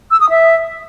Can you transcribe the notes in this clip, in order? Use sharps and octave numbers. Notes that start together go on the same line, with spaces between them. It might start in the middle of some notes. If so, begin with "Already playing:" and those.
E6
D#6
E5